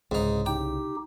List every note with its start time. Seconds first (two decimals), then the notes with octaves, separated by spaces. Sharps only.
0.11 C2 G#2 C#3 D#4
0.46 D#4 G4 G5